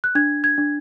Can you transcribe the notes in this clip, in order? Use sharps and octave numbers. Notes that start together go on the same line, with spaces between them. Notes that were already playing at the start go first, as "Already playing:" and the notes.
F#6
D4 G#6
G#6
D4